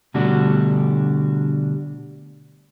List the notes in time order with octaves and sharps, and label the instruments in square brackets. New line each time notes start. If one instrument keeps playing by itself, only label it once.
[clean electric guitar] B2 D3 G3 A3 D4 F#4